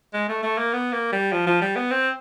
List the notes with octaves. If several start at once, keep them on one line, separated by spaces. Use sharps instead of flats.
G#3
A3
A3
A#3
B3
A#3
G3
F3
F3
G3
B3
C4